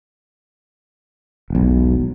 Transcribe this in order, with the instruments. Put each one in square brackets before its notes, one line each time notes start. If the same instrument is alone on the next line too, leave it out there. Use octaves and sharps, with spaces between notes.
[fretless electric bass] E1 B1